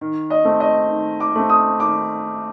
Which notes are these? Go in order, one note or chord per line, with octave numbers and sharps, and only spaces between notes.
D#3
D#5
A3 C4
D#5
D#3
D6
A3 C4
D#6
D#3 D6